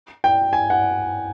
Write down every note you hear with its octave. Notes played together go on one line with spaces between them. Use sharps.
G5
G#5
F#5